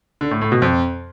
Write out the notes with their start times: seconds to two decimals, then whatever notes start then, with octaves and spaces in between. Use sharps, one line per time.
0.21 D3
0.31 A2
0.41 A2
0.52 B2
0.62 F2